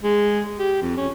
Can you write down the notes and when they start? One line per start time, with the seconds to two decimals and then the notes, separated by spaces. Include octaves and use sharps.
0.03 G#3
0.59 G4
0.82 F2
0.98 C#4